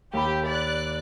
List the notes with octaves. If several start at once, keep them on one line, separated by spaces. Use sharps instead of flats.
D#2 G4 B5
D5 F#6